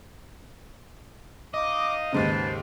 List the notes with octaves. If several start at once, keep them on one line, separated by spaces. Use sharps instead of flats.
D#4 D#5 F5 D6
D#2 G#2 C#3 B4 C5 A5